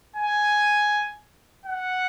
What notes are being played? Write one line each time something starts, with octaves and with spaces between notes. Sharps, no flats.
G#5
F#5